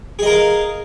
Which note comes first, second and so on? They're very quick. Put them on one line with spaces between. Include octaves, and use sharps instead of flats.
G#4 D#5 A#4 F5